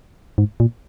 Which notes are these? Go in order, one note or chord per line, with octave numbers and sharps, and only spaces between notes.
G#2
A#2